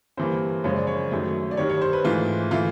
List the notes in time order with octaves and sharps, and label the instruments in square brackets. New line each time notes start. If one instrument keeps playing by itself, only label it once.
[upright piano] G2 E3 G3 A#3 C5
F#2 C#3 F3 G#3 C#5
D5
C#5
F#2 D#3 F#3 A3
D5
G2 D#3 G3 C#5
C#5
C5
B4
G#2 E3 A3 F4
E3 A3 F4